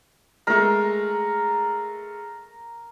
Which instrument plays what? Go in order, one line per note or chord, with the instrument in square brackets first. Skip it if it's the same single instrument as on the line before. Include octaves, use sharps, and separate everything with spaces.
[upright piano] G#3 A3 [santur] A#4